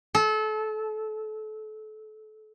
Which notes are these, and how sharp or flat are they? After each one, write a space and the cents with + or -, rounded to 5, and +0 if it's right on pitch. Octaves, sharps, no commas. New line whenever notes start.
A4 -30